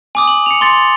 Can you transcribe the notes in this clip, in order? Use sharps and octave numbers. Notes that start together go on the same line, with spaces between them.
G#5 D6 D#6
F#7
C#7 F7
C6 A6 C#7